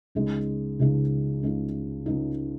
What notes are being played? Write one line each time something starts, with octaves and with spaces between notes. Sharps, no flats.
C#2 C#3 G#3 D#4
C#2 C#3 G#3 D#4
C#2 C#3 G#3 D#4
C#2 C#3 G#3 D#4